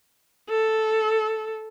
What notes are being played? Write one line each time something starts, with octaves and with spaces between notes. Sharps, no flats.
A4